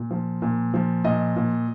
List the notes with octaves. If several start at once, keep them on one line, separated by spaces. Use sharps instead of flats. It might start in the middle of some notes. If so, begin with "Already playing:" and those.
Already playing: A#2
F3
A#2
F3
A#2 D#5
A#2